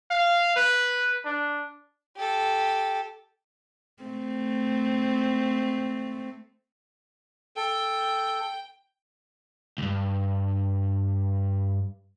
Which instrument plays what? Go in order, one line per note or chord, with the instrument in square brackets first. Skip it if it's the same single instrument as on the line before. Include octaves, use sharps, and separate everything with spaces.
[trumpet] F5
B4
D4
[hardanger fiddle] G4 A4
[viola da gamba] A3 C4
[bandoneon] A4 [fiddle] G5
[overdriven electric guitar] C#2 G2